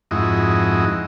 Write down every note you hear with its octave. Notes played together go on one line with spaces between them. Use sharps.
F2 G#2 E4 F#4 D#5